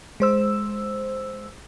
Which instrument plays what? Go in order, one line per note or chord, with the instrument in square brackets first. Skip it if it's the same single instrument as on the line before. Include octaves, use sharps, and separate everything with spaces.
[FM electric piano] G#3 C5 E6